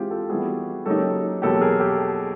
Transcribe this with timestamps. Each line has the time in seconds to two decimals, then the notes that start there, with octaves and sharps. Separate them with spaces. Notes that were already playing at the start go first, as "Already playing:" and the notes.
Already playing: E3 G#3 C4 F4 G4 G#4
0.11 G4 A4
0.29 E3 G3 B3 F#4 G#4
0.86 C#3 F#3 A#3 D#4 G4 A4
1.42 E2 B2 F#3 A#3 G4 A4
1.61 G#4 A#4
1.80 G4 A4